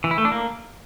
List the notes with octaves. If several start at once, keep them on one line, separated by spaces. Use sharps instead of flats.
E3
E4
A3
D4
A#3